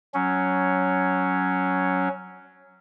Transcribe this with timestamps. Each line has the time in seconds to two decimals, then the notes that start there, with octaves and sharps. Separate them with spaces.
0.14 F#3 C#4